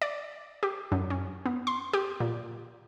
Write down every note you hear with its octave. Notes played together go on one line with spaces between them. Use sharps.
D5
G4
F#2
C#4
B3
C6
G4
A#2